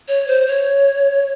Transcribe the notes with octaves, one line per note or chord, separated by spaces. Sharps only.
C#5
C5
C#5